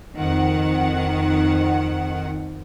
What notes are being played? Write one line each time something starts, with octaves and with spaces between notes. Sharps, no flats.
F2 D#3 F#5